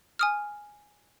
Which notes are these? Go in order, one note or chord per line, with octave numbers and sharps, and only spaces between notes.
G#5 D#6 F6